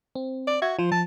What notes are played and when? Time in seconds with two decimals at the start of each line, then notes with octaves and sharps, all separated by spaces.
0.15 C4
0.47 D5
0.62 F#4 E5 G#6
0.79 F3 C5
0.91 F3 A5